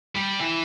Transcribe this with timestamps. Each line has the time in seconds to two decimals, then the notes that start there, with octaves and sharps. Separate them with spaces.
0.16 G3
0.41 E3